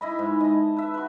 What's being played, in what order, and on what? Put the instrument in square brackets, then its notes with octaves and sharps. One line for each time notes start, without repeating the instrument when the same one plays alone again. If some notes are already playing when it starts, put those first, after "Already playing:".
[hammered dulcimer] E4 D#5 B5
G#2
D#5 A5
B4 E5
F#4 B4